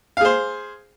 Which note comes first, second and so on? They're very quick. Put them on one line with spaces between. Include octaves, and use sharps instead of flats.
F5 G#4 C5